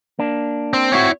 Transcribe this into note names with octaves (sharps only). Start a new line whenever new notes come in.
A#3 D4
C4
C4 E4 F#4 C#5